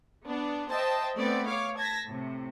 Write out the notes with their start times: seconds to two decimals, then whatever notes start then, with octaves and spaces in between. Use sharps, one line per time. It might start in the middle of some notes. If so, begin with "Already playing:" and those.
0.25 B3 D4
0.70 C5 D#5 E5 G5 A5
1.17 A3 B3 C4 D5
1.46 C#5 F5 D6
1.77 A5 G#6 A#6 B6
2.06 A2 C3